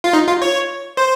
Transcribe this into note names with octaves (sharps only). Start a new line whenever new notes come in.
F4
D#4
F4
C#5
C5